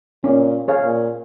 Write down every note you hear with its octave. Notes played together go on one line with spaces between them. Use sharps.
A#2 C#4
G#4 C#5 F5
A#2